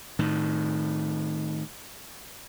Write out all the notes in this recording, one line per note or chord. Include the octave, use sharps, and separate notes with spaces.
A2 D#3